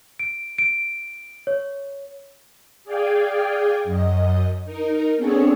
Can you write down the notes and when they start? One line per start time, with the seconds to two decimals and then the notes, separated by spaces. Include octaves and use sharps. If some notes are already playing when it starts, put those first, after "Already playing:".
0.19 D7
0.58 D7
1.47 C#5
2.84 G#4 D5 F5 G5 G#5
3.84 F#2 D#5
4.65 D#4 A#4
5.17 B3 C4 D4 G#4 A4 C#5